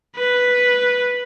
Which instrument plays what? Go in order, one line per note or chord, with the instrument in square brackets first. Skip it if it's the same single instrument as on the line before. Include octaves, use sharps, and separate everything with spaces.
[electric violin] B4